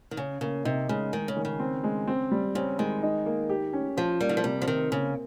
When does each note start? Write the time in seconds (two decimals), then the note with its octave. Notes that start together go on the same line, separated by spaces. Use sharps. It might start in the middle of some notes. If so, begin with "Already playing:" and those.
0.11 D#3
0.17 C#3 C#4
0.41 C#3 A#3
0.65 C3 D#4
0.89 C#3 G#3
1.13 D#3 G#3
1.28 C#3
1.37 D#3
1.45 C#3
1.60 C4
1.84 G#3
2.08 C4
2.31 G3
2.55 C#3 C4
2.79 D#3 G#3
3.03 D#4
3.26 A#3
3.49 G4
3.73 C#4
3.97 F3 F4
4.20 G3 A#3
4.29 D#3
4.37 F3
4.44 C3 G3
4.62 F3
4.68 D#3 C4
4.92 C#3 A#3